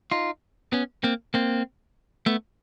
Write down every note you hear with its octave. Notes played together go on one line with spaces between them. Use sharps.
D#4 F4
B3 C#4
A#3 C4
A#3 C4
A3 B3